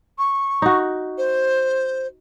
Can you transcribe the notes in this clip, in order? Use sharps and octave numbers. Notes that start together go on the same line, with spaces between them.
C#6
D#4 F#4
C5